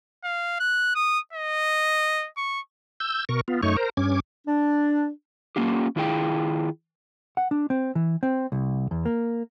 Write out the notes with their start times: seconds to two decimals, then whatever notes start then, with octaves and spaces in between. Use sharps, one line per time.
0.24 F5
0.60 F#6
0.95 D#6
1.33 D#5
2.37 C#6
3.00 E6 G6
3.29 B2 A#4 C#6
3.48 B3 F4
3.63 F#2 A3 D#4 C#5 C#6
3.77 A#4 C5 A#5
3.97 G2 C#4 D6 G#6
4.46 D4
5.56 A#3 C#4 F4 G4
5.96 D#3 E4 F4 G#4 G5
7.37 F#5
7.51 D4
7.70 C4
7.95 E3
8.23 C4
8.52 C2
8.91 E2
9.06 A#3